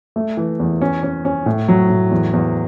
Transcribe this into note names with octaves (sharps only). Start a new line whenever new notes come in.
A3
E3
E2
C#4
C#4
C#4
A2
F#3
A2
E2
E2